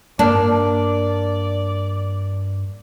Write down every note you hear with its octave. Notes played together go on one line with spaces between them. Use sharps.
G2 A#3 D4 D5